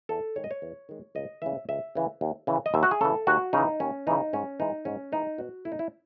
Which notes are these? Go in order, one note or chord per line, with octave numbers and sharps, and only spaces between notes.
E2 A4
D#3 G#3 C#5
D#5
C#5
E2
D#3 G#3
C#2 D#5
C#3 E3 E5
C#2 E5
C#3 E3
D#2
C#3 E3
D#5
D#2 E5
F#4
G#4
C#3 E3 A4
D#2 F#4
C#3 E3 D#4
D#2 C#4
C#3 E3 D#4
G#2 C#4
E3 G#3 D#4
G#2 C#4
E3 G#3 D#4
B2 F#4
A3 E4
D#4
E4